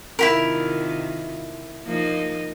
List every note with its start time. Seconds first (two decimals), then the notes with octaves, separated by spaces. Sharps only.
0.19 C3 D#3 E4 F4 G4 A#4
1.85 F3 A#3 D#4